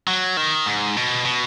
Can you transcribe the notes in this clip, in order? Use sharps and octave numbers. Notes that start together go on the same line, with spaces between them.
F#3
D#3
G#2
B2
B2